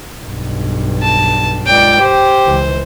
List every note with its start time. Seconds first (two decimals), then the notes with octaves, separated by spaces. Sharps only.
0.23 B1 G2
1.02 A5
1.66 C#2 D5 G5
2.00 G4 C5
2.46 C#2 E3